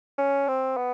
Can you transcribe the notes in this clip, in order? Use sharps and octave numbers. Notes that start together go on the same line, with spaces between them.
C#4
C4
B3